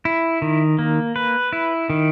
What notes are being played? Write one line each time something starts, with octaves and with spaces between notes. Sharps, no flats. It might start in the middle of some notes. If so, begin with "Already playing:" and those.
E4
D#3
A#3
B4
E4
D#3